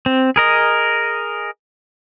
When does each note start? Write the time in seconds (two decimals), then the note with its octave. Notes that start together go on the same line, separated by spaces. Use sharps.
0.06 C4
0.36 G#4 A#4 D#5